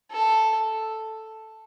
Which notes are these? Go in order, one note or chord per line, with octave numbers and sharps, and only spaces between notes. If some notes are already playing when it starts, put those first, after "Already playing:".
A4